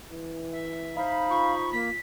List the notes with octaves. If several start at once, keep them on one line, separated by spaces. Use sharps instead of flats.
E3
E5
D#4 C5 F5 B5
F4 C#6
A#3 B6